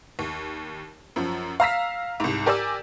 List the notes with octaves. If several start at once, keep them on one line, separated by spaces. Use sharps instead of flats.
D#2
F#2 F3
F5 A#5 E6 B6
C2 G#2
G4 A#4 D5 G#5 D6 E6